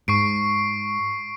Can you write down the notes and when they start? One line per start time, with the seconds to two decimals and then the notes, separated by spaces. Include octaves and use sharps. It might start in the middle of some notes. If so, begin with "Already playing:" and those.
0.08 G#2 C#6 C7 D7